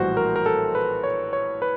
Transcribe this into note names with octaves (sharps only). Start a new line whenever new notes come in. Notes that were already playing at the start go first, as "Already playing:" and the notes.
Already playing: A#1 A2 E3 G3 F#4 C5
A#4
A#4
A4
B4
C#5
C#5
B4